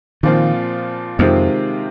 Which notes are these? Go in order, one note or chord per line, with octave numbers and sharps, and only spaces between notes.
A#2 D#3 F3 C4 F4
F2 C3 D#3 G#3 C4 F4